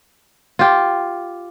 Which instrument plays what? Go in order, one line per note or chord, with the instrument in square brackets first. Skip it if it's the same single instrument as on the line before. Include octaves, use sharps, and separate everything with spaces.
[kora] F4 G4